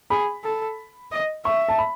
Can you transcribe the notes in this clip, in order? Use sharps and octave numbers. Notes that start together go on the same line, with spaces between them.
G#4 B5
A4
D#5
E5 C#6
A5
B5